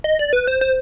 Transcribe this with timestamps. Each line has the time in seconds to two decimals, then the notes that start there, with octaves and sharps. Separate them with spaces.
0.04 D#5
0.19 D5
0.33 B4
0.47 C5
0.61 C5